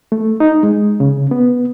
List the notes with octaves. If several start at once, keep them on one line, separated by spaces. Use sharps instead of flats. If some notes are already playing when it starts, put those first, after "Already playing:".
A3
D#4
G#3
C#3
B3